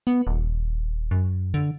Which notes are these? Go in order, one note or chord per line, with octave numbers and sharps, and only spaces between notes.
B3
D#1
F#2
D3